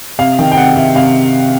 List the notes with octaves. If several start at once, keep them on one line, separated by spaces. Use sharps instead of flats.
C3 F5
D#3 G5
G5
C3 F#5
C3 E5
C3 F5